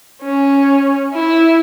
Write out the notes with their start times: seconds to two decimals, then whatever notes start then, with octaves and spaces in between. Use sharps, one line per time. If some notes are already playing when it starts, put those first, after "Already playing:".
0.22 C#4
1.14 E4